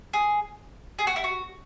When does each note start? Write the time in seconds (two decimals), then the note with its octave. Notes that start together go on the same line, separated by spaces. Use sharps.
0.13 G#4
0.99 G#4
1.07 F#4
1.16 E4
1.24 F#4